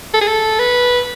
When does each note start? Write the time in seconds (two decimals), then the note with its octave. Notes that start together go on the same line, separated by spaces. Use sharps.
0.14 A4
0.21 G#4
0.27 A4
0.59 B4